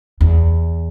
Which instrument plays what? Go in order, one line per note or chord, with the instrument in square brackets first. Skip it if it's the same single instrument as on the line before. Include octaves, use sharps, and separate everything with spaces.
[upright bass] E2